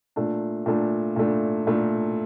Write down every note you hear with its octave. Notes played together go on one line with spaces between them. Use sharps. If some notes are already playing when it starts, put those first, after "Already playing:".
A#2 A3 D4
A#2 A3 D4
A#2 A3 D4
A#2 A3 D4